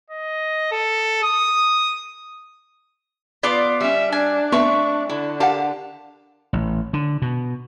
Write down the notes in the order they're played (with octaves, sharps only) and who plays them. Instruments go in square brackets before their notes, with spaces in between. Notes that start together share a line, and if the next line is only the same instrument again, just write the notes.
[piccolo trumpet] D#5
A4
D#6
[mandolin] B3 F4 D6 [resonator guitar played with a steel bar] D5
[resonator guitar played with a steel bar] G3 C#4 [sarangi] E5
[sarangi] D4 [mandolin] G#5
[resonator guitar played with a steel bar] A3 C4 E5 [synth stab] B3 [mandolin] C#6
[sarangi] D3 [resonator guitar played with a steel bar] E4
[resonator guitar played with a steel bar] G4 F5 A5 [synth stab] A#4 F#5
[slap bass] A1
D3
B2